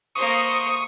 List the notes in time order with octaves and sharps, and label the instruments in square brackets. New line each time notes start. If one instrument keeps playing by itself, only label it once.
[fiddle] A#3 C5 [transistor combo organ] C#6 D#6